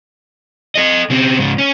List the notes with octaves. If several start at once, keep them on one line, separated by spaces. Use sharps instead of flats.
A4 D#5
C#3 C4
G#2 C#3
C#4